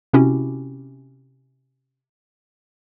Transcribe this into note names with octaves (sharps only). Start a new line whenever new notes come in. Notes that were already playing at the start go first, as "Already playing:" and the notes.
C3 C4 C#4 E4 F#4 G4